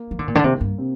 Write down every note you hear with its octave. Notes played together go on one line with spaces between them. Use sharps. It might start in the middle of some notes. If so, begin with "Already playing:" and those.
Already playing: A#3
F3
D3
A#2
D3
C3 A#3
G2
C3 C4